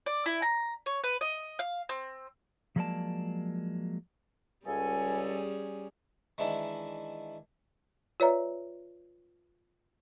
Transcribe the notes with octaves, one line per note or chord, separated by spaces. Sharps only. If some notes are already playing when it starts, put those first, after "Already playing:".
D5
E4
A#5
C#5
B4
D#5
F5
C4
F3 F#3 G#3 A#3 D5 A5
C#2 G3 C#4 G#4 A4 G#5
D#3 E3 G#3 D4 E4
F4 B4 C#5 D5 E5 A#5